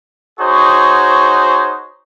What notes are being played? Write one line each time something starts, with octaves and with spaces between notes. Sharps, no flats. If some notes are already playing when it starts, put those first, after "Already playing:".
D#4 F#4 G#4 C5 C#5